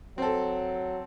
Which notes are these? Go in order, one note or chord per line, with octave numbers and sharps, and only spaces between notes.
F#3 C4 A4